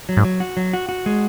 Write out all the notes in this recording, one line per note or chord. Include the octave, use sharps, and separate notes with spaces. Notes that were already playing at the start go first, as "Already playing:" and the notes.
F#3
G#2
F#3
F#4
F#3
F#4
F#4
G#3